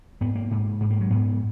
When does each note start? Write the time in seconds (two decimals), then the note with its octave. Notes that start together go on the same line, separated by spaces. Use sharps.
0.21 G#2 B3
0.35 A#3
0.51 G#2
0.80 G#2 G#3
0.91 A#3
1.01 F#3
1.11 G#2 B3